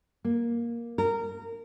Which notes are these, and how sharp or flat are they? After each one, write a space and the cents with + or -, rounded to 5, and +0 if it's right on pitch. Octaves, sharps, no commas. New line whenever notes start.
A#3 +10
A#4 -20